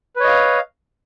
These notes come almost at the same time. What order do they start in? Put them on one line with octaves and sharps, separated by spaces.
B4 C#5 D#5 F5